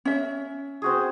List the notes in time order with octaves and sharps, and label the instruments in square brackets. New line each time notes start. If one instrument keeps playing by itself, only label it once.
[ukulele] C#4 E5
[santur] C4 F#4 G#4